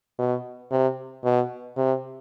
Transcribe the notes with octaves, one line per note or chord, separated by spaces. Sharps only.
B2
C3
B2
C3